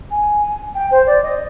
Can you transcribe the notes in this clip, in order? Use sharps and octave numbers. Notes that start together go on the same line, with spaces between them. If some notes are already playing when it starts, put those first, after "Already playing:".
G#5
G5
C5
D5
D#5